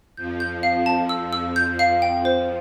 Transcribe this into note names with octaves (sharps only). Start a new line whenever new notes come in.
F2 F3 G6
G6
F5
A5
E6
E6
G6
F5
F2 F3 G5
C5